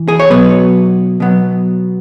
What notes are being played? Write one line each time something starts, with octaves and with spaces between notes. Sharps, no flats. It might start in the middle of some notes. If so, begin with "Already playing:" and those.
Already playing: E3
G#4
C#5
B2 F#3 B3 B4
B2 F#3 B3